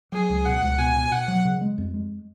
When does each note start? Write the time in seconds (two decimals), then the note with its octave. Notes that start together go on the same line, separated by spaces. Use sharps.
0.12 F#3 G#4
0.30 C#2
0.46 B2 F#5
0.62 C#2
0.78 B2 G#5
0.95 B2
1.11 B2 F#5
1.28 F#3
1.45 C#3
1.61 G#3
1.78 F2
1.94 G#3